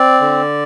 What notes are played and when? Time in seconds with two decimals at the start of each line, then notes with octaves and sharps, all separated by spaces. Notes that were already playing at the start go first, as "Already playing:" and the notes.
Already playing: C4 D5
0.21 D3